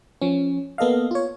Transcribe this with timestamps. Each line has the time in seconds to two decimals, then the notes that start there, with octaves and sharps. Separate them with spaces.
0.21 F3 C#4
0.78 A#3 B3 A4 D#5 F5
1.11 F4 C#5